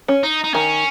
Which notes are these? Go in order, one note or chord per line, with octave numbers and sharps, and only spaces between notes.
C#4
D#4
D#4
D#3 C#4